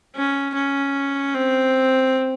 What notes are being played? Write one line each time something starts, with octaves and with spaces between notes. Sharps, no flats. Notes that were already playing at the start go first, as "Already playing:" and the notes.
C#4
C#4
C4